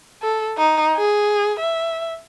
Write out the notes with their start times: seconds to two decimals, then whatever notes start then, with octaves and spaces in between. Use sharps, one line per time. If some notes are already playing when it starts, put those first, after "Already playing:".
0.22 A4
0.58 D#4
0.97 G#4
1.60 E5